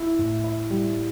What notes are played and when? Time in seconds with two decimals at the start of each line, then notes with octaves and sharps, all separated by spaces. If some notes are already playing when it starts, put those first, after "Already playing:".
Already playing: E4
0.19 A2
0.44 E4
0.70 G3